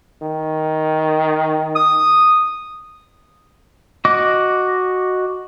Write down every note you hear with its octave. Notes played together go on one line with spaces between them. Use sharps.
D#3
D#6
F#4 D#5 D6